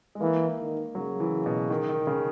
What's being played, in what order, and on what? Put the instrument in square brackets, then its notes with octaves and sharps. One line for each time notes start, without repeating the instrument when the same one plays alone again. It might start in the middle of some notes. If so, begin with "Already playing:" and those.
[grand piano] G#3
[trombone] E3 [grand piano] A#3
[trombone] D#3
[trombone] C#3 [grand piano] F#3
[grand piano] E3
B2
D#3
D#3
C#3